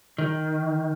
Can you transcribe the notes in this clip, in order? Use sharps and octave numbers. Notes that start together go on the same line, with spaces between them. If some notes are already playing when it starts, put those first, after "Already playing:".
D#3